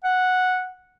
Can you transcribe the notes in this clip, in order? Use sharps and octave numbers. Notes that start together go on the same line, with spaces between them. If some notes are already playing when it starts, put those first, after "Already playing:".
F#5